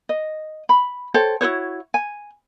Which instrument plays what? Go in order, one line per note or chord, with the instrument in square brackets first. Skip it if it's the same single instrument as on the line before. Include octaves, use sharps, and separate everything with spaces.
[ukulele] D#5
B5
A4 C5 C#5 G5
E4 F#4 C5 C#5
G#5